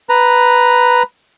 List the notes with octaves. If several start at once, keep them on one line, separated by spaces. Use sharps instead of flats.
B4 A#5